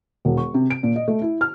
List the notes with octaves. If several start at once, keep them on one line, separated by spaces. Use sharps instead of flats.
E1
C#6
C3
D7
A#2
D#5
A3
E4
F6